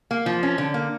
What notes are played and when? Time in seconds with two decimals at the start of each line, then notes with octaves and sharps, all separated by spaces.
0.11 A#3
0.26 F3
0.43 C#4
0.58 D3
0.74 A#3